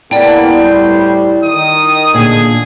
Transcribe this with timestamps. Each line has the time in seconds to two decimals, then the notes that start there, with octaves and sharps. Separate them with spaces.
0.11 C#3 A#3 B3 E4 D5 G5 A5
0.52 A2 G3 C5
1.44 D#3 D#6
2.14 A#2 D3 G#4